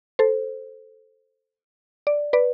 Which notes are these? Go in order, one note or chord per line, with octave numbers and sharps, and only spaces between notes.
A4 C5
D5
B4 D5